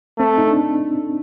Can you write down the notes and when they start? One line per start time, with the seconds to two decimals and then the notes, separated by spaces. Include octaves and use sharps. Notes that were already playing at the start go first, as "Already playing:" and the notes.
0.18 A3 C4
0.38 D#4
0.47 D4